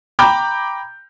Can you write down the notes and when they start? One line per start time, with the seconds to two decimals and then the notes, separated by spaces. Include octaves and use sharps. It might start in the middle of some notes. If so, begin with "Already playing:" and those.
0.19 G5 A#5 B5 D6 G6